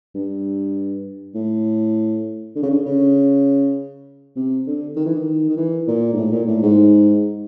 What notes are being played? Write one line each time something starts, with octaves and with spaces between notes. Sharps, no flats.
G2
A2
D3
C#3
D3
C#3
C3
D3
D#3
E3
D#3
D#3
E3
A#2
G#2
A2
A#2
A2
G#2